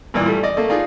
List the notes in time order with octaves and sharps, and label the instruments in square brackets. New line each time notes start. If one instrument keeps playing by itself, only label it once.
[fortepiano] G2 A#2 E3 D4
G3 A3
D5 D#5
A3 A#3
D4 D#4 F4 G#4